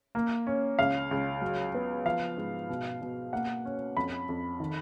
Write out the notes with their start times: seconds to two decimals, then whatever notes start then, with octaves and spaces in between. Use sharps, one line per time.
0.15 A#3
0.47 C#4
0.79 C#2 F5
1.11 C#2
1.42 F#3
1.74 B3
2.05 F3 F5
2.37 G#2
2.69 B2
3.01 B2
3.33 A#3 F#5
3.65 C#4
3.96 F2 B5
4.29 F2
4.60 D#3